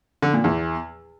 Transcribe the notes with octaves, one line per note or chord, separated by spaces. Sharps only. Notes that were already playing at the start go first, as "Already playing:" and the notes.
D3
A#2
E2